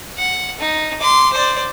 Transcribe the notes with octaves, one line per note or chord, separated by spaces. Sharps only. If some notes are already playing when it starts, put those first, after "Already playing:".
F#5
D#4
C6 D6
C5 D5